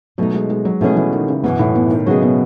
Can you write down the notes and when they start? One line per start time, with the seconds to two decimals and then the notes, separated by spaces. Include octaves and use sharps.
0.18 B2 F#3 A3 D#4
0.34 G#3
0.50 G#3
0.65 F#3
0.81 B2 E3 A3 C#4 G#4
0.97 E3
1.13 D#3
1.28 C#3
1.43 F#2 B2 E3 B3
1.59 A2
1.75 B2
1.91 D#3
2.06 C#3 F#3 B3 E4 G#4 D#5
2.22 B2